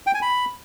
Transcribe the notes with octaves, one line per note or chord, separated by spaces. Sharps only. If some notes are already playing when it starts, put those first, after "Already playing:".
G5
G#5
B5